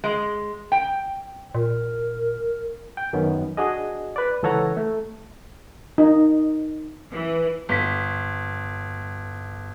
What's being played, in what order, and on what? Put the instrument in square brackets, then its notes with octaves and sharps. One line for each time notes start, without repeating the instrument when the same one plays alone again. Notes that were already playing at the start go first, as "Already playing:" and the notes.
[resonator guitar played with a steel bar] G#3
G5
[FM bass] A#2 [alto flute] A#4
[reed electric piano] G5
F#2 D#3 B3 C#4
D4 F#4 G#4 D#5
B4 D5
C#2 E3 A4 C#5 F#5 A#5
A3
[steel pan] D#4
[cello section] E3
[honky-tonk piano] G1 B6